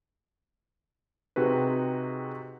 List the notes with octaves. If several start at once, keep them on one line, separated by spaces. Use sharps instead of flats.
C3 C4 D#4 F#4 G#4 B4